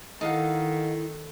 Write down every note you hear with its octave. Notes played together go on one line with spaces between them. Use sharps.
D#3 D#4 E4 A4 F5 F#5